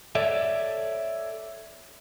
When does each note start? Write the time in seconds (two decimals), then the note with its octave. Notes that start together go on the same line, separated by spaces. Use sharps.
0.15 A4 C#5 D5 E5